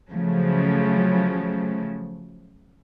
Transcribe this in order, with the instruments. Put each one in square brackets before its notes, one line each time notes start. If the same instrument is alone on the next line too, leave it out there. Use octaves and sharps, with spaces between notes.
[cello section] C#3 F3 F#3 A3